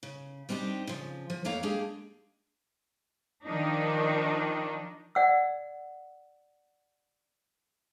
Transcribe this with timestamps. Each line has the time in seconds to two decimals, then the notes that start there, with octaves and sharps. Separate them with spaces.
0.03 C#3
0.49 G3 C4 D4 D#4 G4
0.87 C#3 F3
1.30 F3
1.45 F2 A3 A#3 C#5 F5 A#5
1.63 G#3 A#3 D4 G4 G#4
3.46 D#3 F3 D4 D#4
5.15 D5 F#5 E6